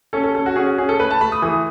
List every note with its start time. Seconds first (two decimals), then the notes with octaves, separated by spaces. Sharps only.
0.13 C#4 A4
0.24 A4
0.35 C#4 A4
0.46 F#4
0.56 C#4 G#4
0.67 F#4
0.78 C#4 G#4
0.89 A4
0.99 A3 B4
1.11 A5
1.21 A3 B5
1.32 D#6
1.42 E3 D#6